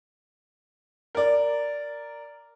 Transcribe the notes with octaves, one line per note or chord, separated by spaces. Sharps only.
A#4 D5